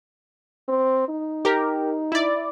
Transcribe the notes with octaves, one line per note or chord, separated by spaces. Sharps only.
C4
D#4
G4 A#4
E4 D5